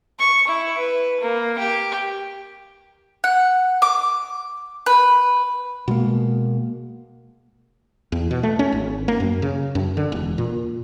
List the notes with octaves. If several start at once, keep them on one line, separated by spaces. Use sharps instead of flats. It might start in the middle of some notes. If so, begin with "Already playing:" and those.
C#6
E4
B4
A#3
G4
F#5
D6
B4
B2 G#3 A#3
E2
B2
A3
C#4
G#1
A#3
F#2
C#3
F#2
D3
E1
A#2